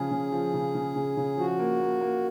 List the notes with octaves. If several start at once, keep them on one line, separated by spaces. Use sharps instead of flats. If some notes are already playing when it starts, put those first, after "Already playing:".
Already playing: C#3 F3 G#4
C#3
F3
C#3
C#3
C#3
C#3
F3 F#4
A#3
A#3
A#3